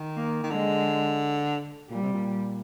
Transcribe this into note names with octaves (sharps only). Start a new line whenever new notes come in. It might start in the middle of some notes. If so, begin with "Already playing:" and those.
Already playing: D#3
A#3
D#3
D3 G#3
A#2 G3
C3
A#2